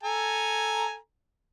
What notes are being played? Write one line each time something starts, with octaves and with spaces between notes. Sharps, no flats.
A4 G#5 A#5